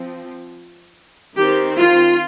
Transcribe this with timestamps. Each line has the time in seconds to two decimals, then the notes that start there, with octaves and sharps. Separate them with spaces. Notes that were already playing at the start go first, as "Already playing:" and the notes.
Already playing: F3 C4
1.36 D#3 C4 G4
1.78 F4